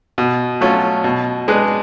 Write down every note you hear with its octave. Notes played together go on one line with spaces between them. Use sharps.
B2
F#3 A3 C#4 F4
B2
G#3 D4 G#4 B4